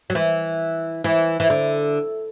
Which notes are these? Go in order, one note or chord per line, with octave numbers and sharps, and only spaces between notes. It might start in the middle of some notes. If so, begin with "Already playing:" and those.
F#3
E3
E3
E3
D3